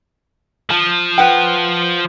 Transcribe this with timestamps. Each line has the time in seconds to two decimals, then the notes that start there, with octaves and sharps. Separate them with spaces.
0.70 F3 A5
1.18 B4 F#5 G5